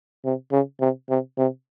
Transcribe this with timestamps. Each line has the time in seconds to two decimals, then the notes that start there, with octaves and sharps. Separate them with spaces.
0.25 C3
0.52 C#3
0.80 C3
1.09 C3
1.38 C3